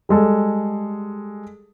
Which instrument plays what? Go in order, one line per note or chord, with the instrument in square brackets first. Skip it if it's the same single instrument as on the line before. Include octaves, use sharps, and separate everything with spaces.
[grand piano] G3 G#3 A4